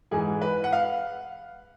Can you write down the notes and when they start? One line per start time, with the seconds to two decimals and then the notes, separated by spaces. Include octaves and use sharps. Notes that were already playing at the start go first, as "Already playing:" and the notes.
0.11 G#2 E3 G#3 G#4
0.41 B4
0.64 F#5
0.73 F5